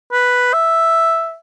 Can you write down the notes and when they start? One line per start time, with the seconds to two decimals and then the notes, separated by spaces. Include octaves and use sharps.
0.12 B4
0.53 E5